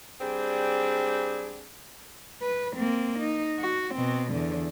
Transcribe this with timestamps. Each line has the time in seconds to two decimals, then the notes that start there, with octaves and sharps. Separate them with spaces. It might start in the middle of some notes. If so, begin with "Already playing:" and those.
0.20 G3 C4 D4 G#4
2.42 B4
2.77 A#3 C4
3.20 D#4
3.60 F#4
3.95 B2 C4
4.32 E2 D3